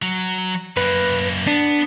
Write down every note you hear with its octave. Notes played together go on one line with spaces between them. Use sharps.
F#3
F#2 A#3 B4
B3 D4